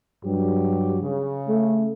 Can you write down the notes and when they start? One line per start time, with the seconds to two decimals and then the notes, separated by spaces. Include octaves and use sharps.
0.25 G2 F#3 G4
1.02 C#3
1.48 A3